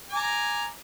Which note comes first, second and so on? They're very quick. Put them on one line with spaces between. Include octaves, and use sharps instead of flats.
G#5 D6 A#5